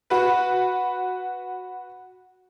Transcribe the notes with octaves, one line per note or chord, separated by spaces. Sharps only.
F#4 B4